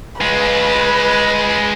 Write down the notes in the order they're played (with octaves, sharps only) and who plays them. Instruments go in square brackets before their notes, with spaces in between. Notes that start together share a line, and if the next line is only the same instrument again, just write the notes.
[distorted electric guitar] G#3 F4 [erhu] B4